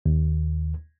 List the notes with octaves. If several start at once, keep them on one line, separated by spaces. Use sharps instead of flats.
D#2